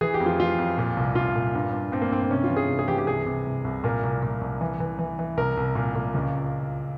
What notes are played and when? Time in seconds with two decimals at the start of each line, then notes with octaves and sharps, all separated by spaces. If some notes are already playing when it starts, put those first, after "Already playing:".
0.01 E3 G#4
0.14 G4
0.20 F2
0.26 F4
0.39 E3 F4
0.58 F2
0.78 A#2
0.97 C2
1.15 C2 F4
1.35 A#2
1.55 G2
1.73 G2
1.92 G2 C4
2.02 A#3
2.11 G2 C4
2.22 C4
2.30 C3 C#4
2.44 F4
2.50 E3
2.57 G#4
2.69 C3
2.79 G#4
2.88 E3 G4
2.98 G4
3.07 C2 G#4
3.26 C3
3.47 C2
3.64 C2
3.84 A#2 A#4
4.03 C2
4.23 A#2
4.41 C2
4.61 E3
4.80 E3
4.99 E3
5.19 E3
5.37 C2 A#4
5.57 C2
5.75 A#2
5.95 A#2
6.14 C#2